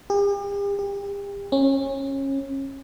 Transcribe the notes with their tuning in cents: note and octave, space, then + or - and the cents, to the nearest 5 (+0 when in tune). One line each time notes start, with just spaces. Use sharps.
G4 +45
G4 +30
C#4 -25